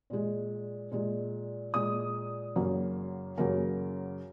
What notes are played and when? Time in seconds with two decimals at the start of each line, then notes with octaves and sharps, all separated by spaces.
0.10 A#2 G#3
0.91 A#2 G#3
1.74 A#2 G#3 D#6
2.56 F#2 C#3 F#3 A#3
3.38 F#2 C#3 F#3 A#3 A#4